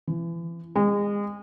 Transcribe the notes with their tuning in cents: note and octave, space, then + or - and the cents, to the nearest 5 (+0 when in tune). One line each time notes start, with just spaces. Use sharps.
E3 +35
G#3 -30